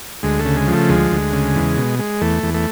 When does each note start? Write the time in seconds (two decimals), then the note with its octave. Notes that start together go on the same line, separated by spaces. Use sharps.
0.23 D2 G#3
0.39 A3
0.45 C#3
0.57 G#3
0.67 F3
0.73 A3
0.89 D2 G#3
1.12 D2
1.33 C#3
1.55 E2
1.77 B2
1.99 G#3
2.21 E2 A3
2.43 E2
2.54 A3